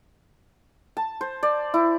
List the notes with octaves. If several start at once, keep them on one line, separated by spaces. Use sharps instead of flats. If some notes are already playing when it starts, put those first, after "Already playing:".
A5
C5
D5
E4